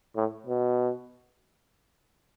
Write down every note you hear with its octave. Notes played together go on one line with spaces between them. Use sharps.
A2
B2